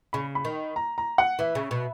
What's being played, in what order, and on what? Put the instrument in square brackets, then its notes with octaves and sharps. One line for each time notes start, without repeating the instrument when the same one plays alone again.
[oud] C#3 [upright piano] B5
[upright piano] B5
[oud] D#3
[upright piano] A#5
A#5
F#5
[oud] E3 [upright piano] E5
[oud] C#3
B2